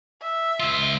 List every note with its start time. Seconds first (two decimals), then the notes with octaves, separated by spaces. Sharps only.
0.22 E5
0.60 C#2 F4